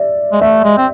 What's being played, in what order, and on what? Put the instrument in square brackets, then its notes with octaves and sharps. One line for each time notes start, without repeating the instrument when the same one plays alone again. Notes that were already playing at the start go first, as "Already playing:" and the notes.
Already playing: [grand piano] D5 E5
[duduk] G#3
[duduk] A3 [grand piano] E5
[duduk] G#3
C4